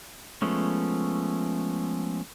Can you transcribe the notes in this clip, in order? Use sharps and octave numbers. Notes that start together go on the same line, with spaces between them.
F3 G#3 A3 B3 C#4